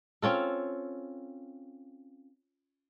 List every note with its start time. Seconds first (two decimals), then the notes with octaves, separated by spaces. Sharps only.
0.22 C4 C#4 F4 A4